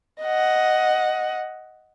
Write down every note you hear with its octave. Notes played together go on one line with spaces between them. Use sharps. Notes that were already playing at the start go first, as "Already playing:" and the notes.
D#5 F#5